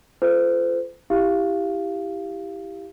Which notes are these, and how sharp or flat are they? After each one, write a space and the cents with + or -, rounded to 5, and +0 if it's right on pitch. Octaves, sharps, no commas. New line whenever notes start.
F4 -20 A4 +0 C5 -35
E4 -5 G4 +0 F5 -15